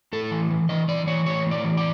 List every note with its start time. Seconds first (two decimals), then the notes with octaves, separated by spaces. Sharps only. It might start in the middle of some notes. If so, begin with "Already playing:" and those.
0.13 A2 A4
0.31 E3
0.51 E3
0.69 E3 D#5
0.88 E3 D5
1.07 E3 C#5
1.26 A2 C#5
1.46 A2
1.51 D5
1.64 E3
1.77 D5